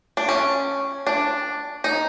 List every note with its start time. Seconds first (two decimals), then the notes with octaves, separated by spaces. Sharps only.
0.17 D4
0.29 C#4
1.07 D4
1.84 D#4